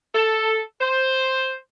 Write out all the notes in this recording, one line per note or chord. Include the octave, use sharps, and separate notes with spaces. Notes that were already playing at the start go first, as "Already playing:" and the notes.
A4
C5